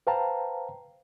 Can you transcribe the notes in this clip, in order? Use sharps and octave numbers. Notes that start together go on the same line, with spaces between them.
B4 C5 F5 G5 A5 A#5